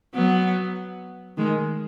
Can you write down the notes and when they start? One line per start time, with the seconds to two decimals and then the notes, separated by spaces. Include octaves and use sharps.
0.15 F#3 B3
1.37 D#3 G#3